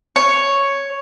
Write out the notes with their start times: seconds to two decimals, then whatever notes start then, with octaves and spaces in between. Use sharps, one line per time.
0.16 C#5